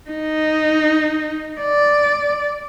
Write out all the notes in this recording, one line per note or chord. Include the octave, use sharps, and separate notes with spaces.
D#4
D5